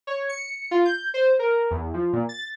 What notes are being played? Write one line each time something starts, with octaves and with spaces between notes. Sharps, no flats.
C#5
C#7
F4
G6
C5
A#4
E2
F3
A#2
A6